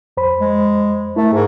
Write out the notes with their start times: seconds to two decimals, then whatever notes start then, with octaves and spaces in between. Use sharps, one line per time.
0.17 F2 C5 B5
0.40 G#3
1.16 A3 E4 A#4 E5
1.33 G#2 G#4 A#4